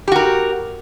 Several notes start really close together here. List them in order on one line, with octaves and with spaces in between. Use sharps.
G4 F#4 A#4